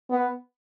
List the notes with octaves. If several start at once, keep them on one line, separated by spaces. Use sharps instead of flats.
B3